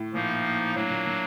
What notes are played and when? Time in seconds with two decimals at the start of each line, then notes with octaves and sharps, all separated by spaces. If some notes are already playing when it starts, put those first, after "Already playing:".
Already playing: A2
0.14 A#2 F3 A#3 D#4
0.75 A2 F#3 A#3 D4
0.90 A#2
1.06 A#2